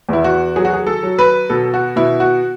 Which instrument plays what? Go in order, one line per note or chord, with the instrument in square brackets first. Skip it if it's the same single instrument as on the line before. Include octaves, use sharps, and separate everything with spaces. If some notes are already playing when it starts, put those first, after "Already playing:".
[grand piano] E2 E4
F#4
F#3 G#4
F#4
G#4
A4
F#3
B4
B2 A4
F#4
B2 E4
F#4